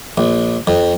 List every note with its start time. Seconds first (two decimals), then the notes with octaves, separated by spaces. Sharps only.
0.18 A#1
0.67 F2